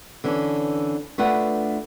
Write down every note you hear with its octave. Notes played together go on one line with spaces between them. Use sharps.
D3 E3 C#4 D4
A3 D4 F4 B4 F#5